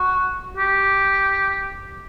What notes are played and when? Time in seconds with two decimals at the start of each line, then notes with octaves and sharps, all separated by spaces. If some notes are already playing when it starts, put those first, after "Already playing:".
Already playing: F#4
0.57 G4